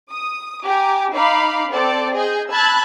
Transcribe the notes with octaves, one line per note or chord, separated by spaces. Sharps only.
D#6
G4 G#5 A#5 D6
D#4 F5 B5 D6 C7
C4 A4 D5
G#4 D#5 G6
A5 B5 E6 F#6 G#6 A6